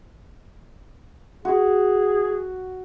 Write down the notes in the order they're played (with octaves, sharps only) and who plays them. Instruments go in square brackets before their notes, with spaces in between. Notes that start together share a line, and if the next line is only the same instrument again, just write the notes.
[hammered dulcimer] F#4 [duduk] G#4